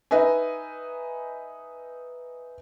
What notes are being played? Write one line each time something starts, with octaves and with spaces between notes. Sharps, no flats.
D#4 B4 D#5 E5 G#5